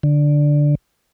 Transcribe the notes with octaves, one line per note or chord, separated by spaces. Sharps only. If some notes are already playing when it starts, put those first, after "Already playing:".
D3